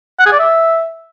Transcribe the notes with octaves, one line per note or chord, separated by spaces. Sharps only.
F#5
G#4
D5
E5